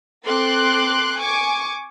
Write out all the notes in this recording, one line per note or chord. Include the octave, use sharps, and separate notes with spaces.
C4 A4 C6 D6 F#6
G#5 C#6 D6